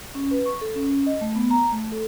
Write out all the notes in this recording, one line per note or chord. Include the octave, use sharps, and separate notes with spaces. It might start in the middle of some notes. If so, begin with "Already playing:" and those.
C#4
B4
C#6
A4
C#4
D#5
A3
B3
A#5
A3
A4